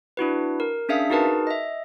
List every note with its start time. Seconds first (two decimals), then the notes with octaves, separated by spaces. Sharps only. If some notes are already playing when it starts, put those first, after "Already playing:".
0.17 D4 E4 F#4 B4
0.60 A#4
0.89 C#4 D4 G#4 E5 F5 B6
1.10 D#4 F#4 G#4 A#4 B4 A5
1.47 D#5 E5